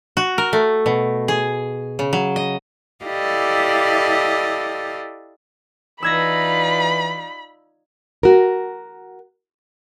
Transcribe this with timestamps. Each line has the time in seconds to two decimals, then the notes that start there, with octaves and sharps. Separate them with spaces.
0.17 F#4
0.38 A#4
0.53 A3
0.86 B2
1.28 G#4
1.99 C#3
2.13 F#3
2.36 D#5
3.06 E4 G4 A4 D5 D#5 F5
6.03 E3 D#4 F4 D5 B5 E6 G#6 A#6
8.23 F#4 A#4